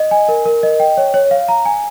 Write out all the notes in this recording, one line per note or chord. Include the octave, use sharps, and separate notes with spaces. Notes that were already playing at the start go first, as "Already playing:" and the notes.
Already playing: D#5
G#5
A#4
A#4
D#5
G5
C#5
C#5
F5
A#5
G#5